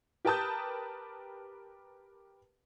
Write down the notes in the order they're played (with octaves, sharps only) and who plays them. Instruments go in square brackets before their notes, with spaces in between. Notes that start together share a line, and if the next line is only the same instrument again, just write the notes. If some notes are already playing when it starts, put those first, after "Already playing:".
[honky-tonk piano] G4 A#4 B4 A5 D#6 G6